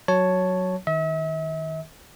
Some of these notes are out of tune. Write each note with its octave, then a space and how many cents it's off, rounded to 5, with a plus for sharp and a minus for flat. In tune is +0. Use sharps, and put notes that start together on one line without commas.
F#3 +0 C#5 +0 A5 +0
D#3 +10 E5 -40